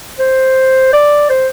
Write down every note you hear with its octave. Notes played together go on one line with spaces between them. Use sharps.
C5
D5
C5